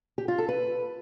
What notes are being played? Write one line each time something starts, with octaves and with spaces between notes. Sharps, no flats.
G4
F4
A4
B4